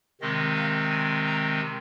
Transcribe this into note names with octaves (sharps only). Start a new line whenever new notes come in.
C3 D#3 G#3 C4 D#5
F5
G#5
A#5